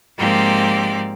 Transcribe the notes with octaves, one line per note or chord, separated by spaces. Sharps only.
G#2 F3 A#3 C4 G4 D5